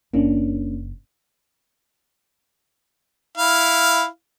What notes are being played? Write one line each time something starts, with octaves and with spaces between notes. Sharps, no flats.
F#1 A#3 C#4 D4
E4 F5